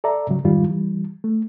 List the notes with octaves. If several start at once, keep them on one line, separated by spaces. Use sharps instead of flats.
A4 D5 E5 A#5
G#2 C#3 F#3
F2 G#2 D#3 G3 F4
E3 G3
A3